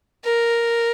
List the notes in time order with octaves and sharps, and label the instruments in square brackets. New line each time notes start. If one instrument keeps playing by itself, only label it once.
[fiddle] A#4